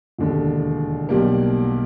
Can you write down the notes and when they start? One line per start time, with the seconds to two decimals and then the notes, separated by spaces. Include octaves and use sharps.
0.19 E1 D#2 D3
1.09 B1 B2 G3 A#3